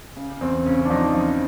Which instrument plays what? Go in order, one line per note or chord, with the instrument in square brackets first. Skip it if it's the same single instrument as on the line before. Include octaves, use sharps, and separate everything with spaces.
[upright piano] C#3
[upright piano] E2 [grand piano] C4
[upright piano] C#3 [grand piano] C#4
[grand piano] D4
[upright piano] F3 [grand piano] D#4
[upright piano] F3